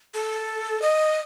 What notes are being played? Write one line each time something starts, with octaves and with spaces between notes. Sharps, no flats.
A4
D#5